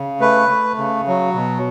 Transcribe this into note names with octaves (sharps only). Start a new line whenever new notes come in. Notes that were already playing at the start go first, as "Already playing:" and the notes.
Already playing: C#3
A3 B4
A3
C#3
F#3
B2